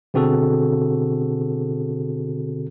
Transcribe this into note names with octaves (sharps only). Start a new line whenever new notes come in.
B2 D3 C4 F#4 G#4 A4